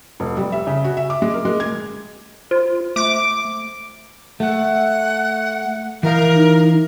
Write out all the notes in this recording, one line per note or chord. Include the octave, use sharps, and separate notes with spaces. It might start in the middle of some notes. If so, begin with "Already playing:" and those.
F1
G3
E5
C#3
F#4
E5
D6
G#3
A#4
G#3
G#6
F4 C5
A3 D6
A3 F#5
E3 A#4 F5
D#4